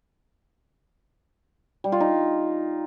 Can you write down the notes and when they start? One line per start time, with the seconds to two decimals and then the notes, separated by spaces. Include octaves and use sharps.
1.84 G3
1.92 F4
2.00 D#4